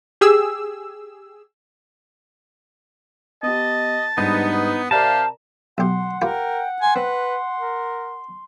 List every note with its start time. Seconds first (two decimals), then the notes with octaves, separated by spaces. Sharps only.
0.21 G4 G#4 E6
3.43 B3 G4 D#5 A5
4.18 G#2 G3 B3 D4 D#4
4.91 C3 G4 A#4 D5 F5 A5 A#5
5.78 B1 G4 F#5 C6
6.22 F4 G4 A#4 B4 G5
6.82 G#5 C6
6.96 C4 B4
7.58 A#4